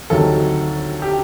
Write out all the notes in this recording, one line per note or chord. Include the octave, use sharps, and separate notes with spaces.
D2 C3 D#3 F#3 A4
G4